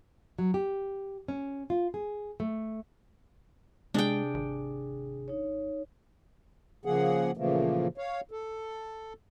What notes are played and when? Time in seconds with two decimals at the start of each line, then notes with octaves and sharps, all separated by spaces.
0.38 F#3
0.54 G4
1.28 C#4
1.70 F4
1.94 G#4
2.40 A3
3.94 C3 G#3 D4 G#4 G5
4.34 G#1
5.28 D#4 C#5
6.85 C#3 F3 A#3 G#4 F#5
7.37 A#2 C#3 E3 F3 A3 A#3
7.98 C#5 F5
8.31 A4